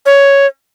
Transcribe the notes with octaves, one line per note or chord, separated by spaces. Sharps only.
C#5